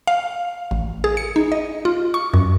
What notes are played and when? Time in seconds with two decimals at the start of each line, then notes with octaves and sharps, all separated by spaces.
0.07 F5
0.71 A1
1.04 G#4
1.17 C#7
1.36 D#4
1.52 D#5
1.85 F4
2.14 C#6
2.34 F#2